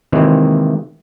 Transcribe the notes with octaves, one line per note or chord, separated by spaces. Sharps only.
C3 D#3 E3 G#3 A#3 C4